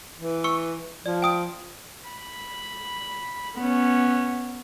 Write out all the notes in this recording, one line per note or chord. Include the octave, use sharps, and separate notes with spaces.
E3
C#6 E6 C#7
F3 D5
G5 D#6 D7
B5
B3 C#4